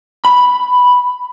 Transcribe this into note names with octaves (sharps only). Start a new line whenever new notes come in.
B5